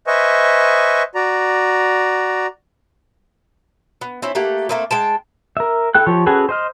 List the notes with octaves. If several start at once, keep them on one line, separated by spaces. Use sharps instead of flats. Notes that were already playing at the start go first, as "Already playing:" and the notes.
B4 C5 D#5 E5 G#5 C#6
F#4 D5 A#5
B3
C4 C#4 E4
A3 A#3 G4 F#5
A3 A#3 C4
G#3 G5 A5
A#4 E5
E4 A4 G5 F#6
F3 G4 C#5
C#4 F#4 G#4 A4 B4
C5 D#5 F6